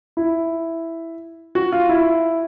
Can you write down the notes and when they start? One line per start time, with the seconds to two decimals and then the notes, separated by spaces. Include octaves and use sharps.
0.17 E4
1.55 F#4
1.72 F4
1.89 E4